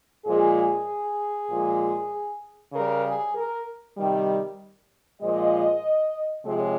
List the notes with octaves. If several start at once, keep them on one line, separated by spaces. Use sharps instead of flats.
A#2 F3 G#3 G#4
A#2 F3 G#3
C#3 G3 A#4
G#4
A#4
C3 D#3 G3
A#2 F3 G#3 D#5
C3 F3 G#3 C#5